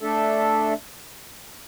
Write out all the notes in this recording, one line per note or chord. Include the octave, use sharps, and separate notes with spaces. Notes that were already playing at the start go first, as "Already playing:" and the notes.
A3 D4 A4 E5